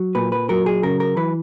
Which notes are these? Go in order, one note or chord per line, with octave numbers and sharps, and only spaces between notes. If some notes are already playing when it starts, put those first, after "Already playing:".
Already playing: F#3
A#2 B4
B4
F#3 A#4
G#4
C#3 A#4
A#4
E3 B4